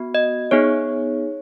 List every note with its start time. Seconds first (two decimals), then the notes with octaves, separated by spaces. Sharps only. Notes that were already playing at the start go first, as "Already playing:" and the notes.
Already playing: B3 F#4
0.15 D#5
0.51 B3 D#4 G#4 C#5